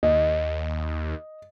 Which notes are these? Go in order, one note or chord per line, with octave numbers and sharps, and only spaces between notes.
D#2 D#5